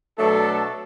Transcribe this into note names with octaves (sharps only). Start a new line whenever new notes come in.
B2 F#3 A3 D4 A4